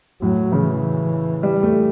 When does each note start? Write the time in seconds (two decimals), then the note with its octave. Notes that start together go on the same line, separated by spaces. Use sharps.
0.22 A2 F#3
0.52 C#3 E3
1.43 G3
1.63 A3